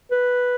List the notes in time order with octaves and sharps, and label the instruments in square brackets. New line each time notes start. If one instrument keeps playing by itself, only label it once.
[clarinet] B4